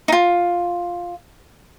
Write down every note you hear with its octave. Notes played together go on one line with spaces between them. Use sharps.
D#4 F4